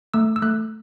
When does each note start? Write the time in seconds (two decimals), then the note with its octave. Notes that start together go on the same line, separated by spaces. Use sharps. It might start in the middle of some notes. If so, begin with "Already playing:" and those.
0.14 A3 E6
0.36 E6
0.42 A3 F#6